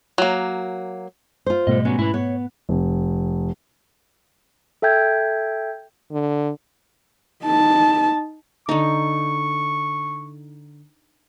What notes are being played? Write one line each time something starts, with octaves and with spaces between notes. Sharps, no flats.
F#3 A#3
F4 C5
G#2 B2 G3 A3 D#5
F#3 G3 B3 C#4
G#2 E4 B4
B3 C#5
F1
A4 E5 G5 G6 G#6
D3
D#4 A5
D3 D#4 C#6